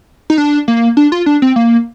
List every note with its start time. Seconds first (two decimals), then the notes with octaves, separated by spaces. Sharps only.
0.30 D#4
0.38 D4
0.68 A#3
0.97 D4
1.12 F4
1.26 D4
1.42 C4
1.56 A#3